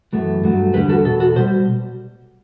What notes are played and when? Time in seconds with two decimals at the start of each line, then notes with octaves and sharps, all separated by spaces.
0.13 F#2 E3 A3
0.43 G2 F#3 A3
0.74 E2 D3 G3 G4 B4
0.89 F#4 A4
1.05 E2 B2 A4
1.20 F#4 A4
1.36 B2 G3 C5